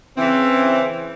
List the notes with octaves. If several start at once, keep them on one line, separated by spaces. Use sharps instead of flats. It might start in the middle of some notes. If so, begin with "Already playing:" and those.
C#3 E3 C4